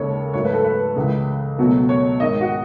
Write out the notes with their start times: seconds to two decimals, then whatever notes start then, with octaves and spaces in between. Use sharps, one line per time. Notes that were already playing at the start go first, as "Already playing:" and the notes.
Already playing: D#2 C#3 G#3 A4 C#5
0.34 G#2 F#3 A3 C#5
0.44 B4
0.54 A4
0.64 B4
0.95 C#2 C#3 E3 G#3
1.58 C#2 B2 F#3 A3
1.89 C#5
2.20 G#2 D#3 G#3 D#5
2.41 F#4